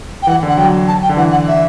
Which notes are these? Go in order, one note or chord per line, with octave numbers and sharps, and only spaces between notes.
G5
E3 F#5
D3
F#5
F#3 G5
A5
G5
D3
E3 F#5
F#5
E5